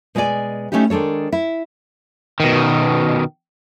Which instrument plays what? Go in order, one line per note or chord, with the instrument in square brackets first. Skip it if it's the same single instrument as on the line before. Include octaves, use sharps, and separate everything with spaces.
[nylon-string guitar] B2 G#3 G#4 C#5 D5 G#5
A3 C#4 D#4 E4 G4
D#3 G#3 D4 A4 C#5
E4
[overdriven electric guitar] B2 D#3